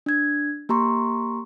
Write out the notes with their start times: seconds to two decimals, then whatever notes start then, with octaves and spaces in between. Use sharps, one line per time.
0.06 D4 G#6
0.69 A#3 G4 A#5 C6 C#6